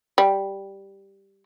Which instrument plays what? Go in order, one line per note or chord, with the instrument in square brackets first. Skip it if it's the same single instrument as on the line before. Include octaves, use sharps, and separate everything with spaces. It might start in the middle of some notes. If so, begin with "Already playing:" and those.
[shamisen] G3